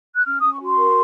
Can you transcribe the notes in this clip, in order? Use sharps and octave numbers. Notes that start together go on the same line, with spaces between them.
F#6
C#4 F6
C#4 D#6
C#6
F#4 C6
A#4